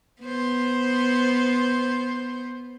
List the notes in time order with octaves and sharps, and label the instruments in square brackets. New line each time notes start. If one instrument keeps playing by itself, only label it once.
[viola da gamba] B3 C5